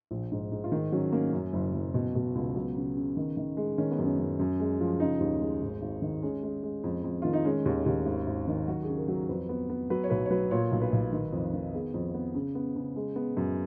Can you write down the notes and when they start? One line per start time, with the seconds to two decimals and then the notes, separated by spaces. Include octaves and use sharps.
0.11 A#1
0.32 G#2
0.52 G#2
0.64 F4
0.72 D#3 D#4
0.92 F#3 C#4
1.12 A#3 C#4
1.33 F#2
1.53 F#1
1.74 F#1
1.94 B2
2.15 B2
2.35 C#2
2.56 F#3 B3
2.76 C#3
2.97 C#3
3.17 D#3
3.37 D#3
3.57 G#3
3.78 D#3 C#4
3.91 B3
3.98 F#2
4.04 C#4
4.19 F#2
4.39 F#2
4.60 G#3
4.80 F3
5.00 C#3 D#4
5.20 D#2
5.41 G#3
5.62 G#1
5.82 G#1
6.02 D#3
6.23 G#3 C#4
6.43 G#3
6.63 G#3
6.84 F2
7.04 F2
7.22 D#3 F4
7.33 D#4
7.45 G#3 C#4
7.66 D#2
7.86 D#2
8.06 G#1
8.27 G#1
8.48 D#3
8.68 F#3 F#4
8.83 C#3 G#4
8.98 A#4
9.08 F#3 A#4
9.29 F2 B4
9.49 B3
9.70 B3
9.90 F#3 B4
10.04 C#5
10.10 B1 B4
10.26 C#5
10.30 F#3 B4
10.51 A#2 C#5
10.72 B1
10.82 B4
10.92 B1
11.13 D#3
11.33 F2
11.53 D#3
11.74 B3 G#4
11.94 F2
12.15 B3
12.35 C#3
12.55 B3
12.76 C#3
12.96 G#3
13.16 B3
13.37 F#2